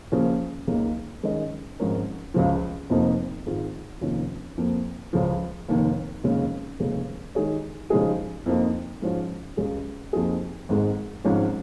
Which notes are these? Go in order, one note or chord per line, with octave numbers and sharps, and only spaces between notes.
C#3 F3 A#3 C#4
C#2 C#3 A#3 D#4
D#3 G#3 C#4 A#4 D#5
G#1 G#2 F3 C#4 A#4
C#2 C#3 F3
F1 F2 F3 A#3 D#4
G#1 G#2 D#3 G#3 F4
F1 D#2 D#3 C#4 F4
F2 F3 A#3
C#2 C#3 F3
F1 D#2 D#3
F1 D#2 C#3 G#3 C#4
F1 D#2 C#3 G#3
D#3 G#3 D#4 G#4 C#5
C#3 F3 G#3 D#4 G#4
F2 F3 A#3 D#4
G#2 F3 C#4 F4
C#2 C#3 G#3 C#4 G#4
F2 F3 A#3 D#4 G#4
G#1 G#2 G#3
G#1 G#2 F3 C#4 F4